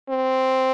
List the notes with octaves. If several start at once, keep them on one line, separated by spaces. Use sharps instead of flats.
C4